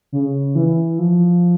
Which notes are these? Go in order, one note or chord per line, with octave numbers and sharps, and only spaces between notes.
C#3
E3
F3